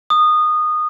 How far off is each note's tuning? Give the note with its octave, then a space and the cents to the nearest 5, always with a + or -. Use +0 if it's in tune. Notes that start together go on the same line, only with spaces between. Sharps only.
D#6 -20